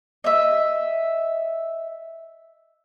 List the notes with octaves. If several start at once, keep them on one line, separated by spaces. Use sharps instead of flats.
D#5 E5